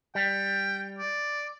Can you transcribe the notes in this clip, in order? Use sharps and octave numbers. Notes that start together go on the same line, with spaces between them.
G3 G5
D5